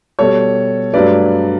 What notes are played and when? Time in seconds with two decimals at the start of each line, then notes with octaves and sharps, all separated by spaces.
0.19 B2 G3 A4 C#5
0.94 G2 F#3 A3 B4 D5